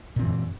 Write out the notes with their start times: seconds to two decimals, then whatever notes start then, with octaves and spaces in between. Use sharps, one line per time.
0.16 A#2
0.19 C4
0.23 E3
0.26 F#2